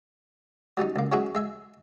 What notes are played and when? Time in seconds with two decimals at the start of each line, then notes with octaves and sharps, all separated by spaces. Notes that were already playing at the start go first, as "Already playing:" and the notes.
0.77 F#3 G3 C#4 D#4
0.96 C#2 A#3
1.12 F#3 G#3 C#4 E4 F#4 G#4
1.35 G#3 E5 G#5